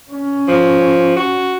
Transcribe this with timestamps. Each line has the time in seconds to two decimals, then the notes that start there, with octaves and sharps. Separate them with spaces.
0.11 C#4
0.48 F3
1.16 F#4